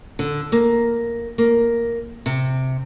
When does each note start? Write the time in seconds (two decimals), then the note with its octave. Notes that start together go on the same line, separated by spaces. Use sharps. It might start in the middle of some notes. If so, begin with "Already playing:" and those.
0.19 D3
0.52 A#3
1.38 A#3
2.26 C3